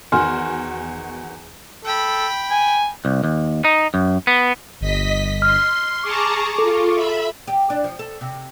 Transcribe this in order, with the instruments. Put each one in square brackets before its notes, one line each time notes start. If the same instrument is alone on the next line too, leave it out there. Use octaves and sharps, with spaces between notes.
[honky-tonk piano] E2 D#3 F#4 [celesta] G#5 C6 F6
[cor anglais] A4 [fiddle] G5 B5
[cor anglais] G#5
[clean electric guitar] C2
D#2
D#4
F#2
B3
[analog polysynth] G1 [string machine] D#5 B6
[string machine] C6 [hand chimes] F6
[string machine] G#4 A5 A#5 [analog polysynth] C#6 D6
[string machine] F4 [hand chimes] A4
[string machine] E5 B5
[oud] G4
D4
F3
A4
C3